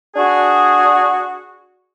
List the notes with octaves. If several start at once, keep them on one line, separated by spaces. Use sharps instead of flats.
D4 F#4 G#4